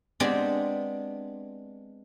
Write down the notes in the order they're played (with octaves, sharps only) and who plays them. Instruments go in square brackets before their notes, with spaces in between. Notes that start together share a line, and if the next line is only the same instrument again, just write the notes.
[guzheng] G#3 B3 C4 D4 G4